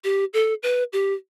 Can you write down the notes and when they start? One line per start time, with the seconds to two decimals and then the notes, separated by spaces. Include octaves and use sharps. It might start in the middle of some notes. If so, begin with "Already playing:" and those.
0.04 G4
0.34 A4
0.63 B4
0.93 G4